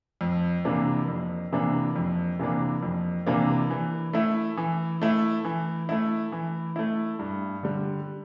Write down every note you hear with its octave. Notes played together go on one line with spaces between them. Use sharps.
F2
C3 E3 A#3 D4
F2
C3 E3 A#3 D4
F2
C3 E3 A#3 D4
F2
C3 E3 A#3 D4
E3
A3 E4
E3
A3 E4
E3
A3 E4
E3
A3 E4
G2
D3 G3